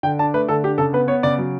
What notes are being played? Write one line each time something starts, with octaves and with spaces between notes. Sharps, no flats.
D3 G5
D4 A5
A3 B4
D3 A4
D4 G4
C#3 A4
B3 B4
B3 C#5
C#3 D5
F#3